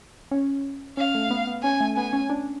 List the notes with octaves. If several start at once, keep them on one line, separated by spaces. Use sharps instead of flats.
C#4
C#4 F5
A3
B3
B3
C#4 G#5
A3
B3 G#5
C#4
D4